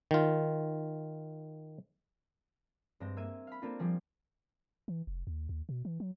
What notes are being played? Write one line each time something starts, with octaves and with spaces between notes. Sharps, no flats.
D#3 F4
G2 G#3 C4 A#6
A#3 E5 G#6 D#7
F5 B5
A#3 C4 D4 F4 A4
F3 G3 G#4
E3
F1
D#2
D#2
B2
E3
F#3